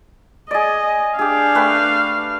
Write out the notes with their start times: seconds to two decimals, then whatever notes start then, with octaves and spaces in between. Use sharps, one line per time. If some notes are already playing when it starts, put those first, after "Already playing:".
0.51 G#4 D5 D#5
1.19 D4 G4 G#4 F5
1.55 A3 B4 G5